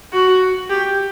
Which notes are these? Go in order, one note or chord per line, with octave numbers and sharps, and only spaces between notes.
F#4
G4